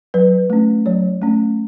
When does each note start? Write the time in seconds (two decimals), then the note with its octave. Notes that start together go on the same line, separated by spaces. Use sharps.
0.14 F#3 B4
0.50 A3 C#4
0.86 F#3 C#5
1.22 A3 C#4